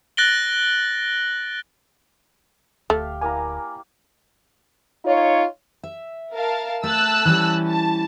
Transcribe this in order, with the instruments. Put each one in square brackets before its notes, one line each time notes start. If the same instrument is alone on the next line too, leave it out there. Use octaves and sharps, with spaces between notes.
[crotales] F#6 A6 A#6 D7 F#7 G7
[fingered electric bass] D1 D2 [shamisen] A3 [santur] G4 F5 G5
[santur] A#3 E4 D5 [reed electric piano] G#5 A#5
[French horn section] D#4 F4 C#5
[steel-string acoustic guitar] E5
[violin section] A#4 F5 A5
[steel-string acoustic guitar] A3 [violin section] A5 E6 F#6
[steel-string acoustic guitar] E3 G3 C#4
[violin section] A5